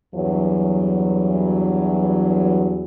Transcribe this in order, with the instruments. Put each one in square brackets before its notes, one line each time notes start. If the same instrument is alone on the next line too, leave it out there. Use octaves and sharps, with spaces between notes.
[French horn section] E2 G2 E3 F#3